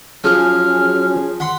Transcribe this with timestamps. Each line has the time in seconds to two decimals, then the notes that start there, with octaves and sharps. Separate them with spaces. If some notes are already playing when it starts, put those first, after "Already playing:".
0.24 F3 F#3 C#4 G#4 F6
1.40 F#5 B5 C6